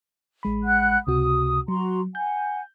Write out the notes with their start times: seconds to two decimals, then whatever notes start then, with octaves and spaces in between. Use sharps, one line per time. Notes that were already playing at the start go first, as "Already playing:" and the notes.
0.43 A1 G#3 B5
0.64 F#5 F#6
1.07 C#2 C3 F#4 D#6
1.68 F#3 F#4 A#5 C6
2.15 F#5 G#5 G6